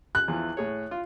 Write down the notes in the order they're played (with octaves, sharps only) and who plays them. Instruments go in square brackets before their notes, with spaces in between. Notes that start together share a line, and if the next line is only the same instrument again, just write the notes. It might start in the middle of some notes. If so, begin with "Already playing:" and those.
[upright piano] F#6
[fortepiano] E2 E3 F3
A2 G#4 C#5
F4